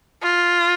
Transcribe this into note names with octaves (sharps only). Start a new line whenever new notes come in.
F4